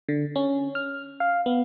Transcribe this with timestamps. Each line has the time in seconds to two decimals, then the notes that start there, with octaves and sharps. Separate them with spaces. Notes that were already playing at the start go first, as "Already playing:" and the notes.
0.09 D3
0.36 C#4
0.75 F6
1.20 F5
1.46 B3